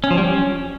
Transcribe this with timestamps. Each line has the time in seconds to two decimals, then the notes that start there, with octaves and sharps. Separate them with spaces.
0.04 C#4
0.11 F3
0.17 G3
0.24 C#4